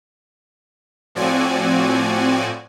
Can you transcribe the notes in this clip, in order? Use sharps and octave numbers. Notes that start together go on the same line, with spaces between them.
A2 F3 C4 F#4 D5 G#5